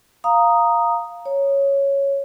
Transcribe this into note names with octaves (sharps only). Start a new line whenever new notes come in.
F5 A#5 D#6
C#5